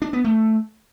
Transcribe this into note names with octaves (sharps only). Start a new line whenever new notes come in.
D4
B3
A3